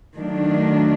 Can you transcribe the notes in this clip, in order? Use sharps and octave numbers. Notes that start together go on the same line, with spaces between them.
D#3 F#3 A3 D4